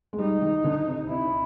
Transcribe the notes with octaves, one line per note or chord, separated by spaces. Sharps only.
G#3
G3 D#4
D#3
D3
C3
C3 E4